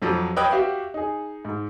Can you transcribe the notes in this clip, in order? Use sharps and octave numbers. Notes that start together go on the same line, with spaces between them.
F2 F3 F#3
B4 C#5 D#5 G5 D#6 F#6
F#4 G4 E5 F5
D#4 G#4
G#2